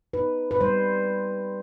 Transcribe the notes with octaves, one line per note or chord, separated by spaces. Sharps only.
D#4 B4
B4
G3 C5